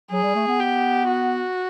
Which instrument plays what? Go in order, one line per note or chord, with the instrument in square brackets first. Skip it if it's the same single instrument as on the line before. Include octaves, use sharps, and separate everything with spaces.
[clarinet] F#3 [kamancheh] G#4
[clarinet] G3
A3
B3
[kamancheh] G4
F#4